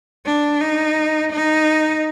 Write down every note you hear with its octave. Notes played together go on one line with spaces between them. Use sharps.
D4
D#4
D#4